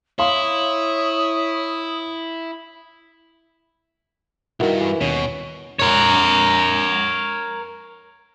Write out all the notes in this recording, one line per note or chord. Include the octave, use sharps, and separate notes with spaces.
E4 C#5 F5 C6 D#6
B1 G2 D#3 E4 F#4 A#4
E3
D#2 B2 C#4
A#4 C#5